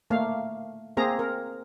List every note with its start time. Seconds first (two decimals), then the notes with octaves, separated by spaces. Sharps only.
0.10 A3 A#3 F5
0.97 A#3 C4 G#4 A#5
1.19 A#4